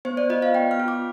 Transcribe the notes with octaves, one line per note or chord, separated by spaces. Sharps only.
B3 C5
D5
F4 D#5
F5
B3 G5
F6
F4
D6